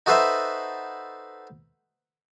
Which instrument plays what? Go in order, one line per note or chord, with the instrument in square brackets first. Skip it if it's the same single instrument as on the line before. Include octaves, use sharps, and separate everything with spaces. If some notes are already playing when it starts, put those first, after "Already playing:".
[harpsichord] D#4 F#4 A4 B4 C5 E5